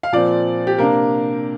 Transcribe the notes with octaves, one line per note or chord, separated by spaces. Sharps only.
F5
A#2 F3 C4 D5
G4
C3 A#3 D4 A#4